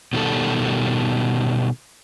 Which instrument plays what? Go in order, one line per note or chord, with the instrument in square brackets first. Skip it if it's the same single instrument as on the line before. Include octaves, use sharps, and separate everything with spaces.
[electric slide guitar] B2 D#3 G3 A4